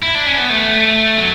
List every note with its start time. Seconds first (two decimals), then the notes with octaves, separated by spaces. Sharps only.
0.02 E4
0.15 D4
0.27 C#4
0.38 B3
0.50 A3
1.17 F#3